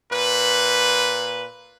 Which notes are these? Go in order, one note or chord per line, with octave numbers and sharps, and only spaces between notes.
A#2 B4